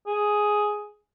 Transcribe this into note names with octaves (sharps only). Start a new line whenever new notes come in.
G#4